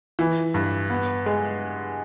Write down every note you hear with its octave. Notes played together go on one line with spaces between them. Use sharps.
E3
G2
B3
G#3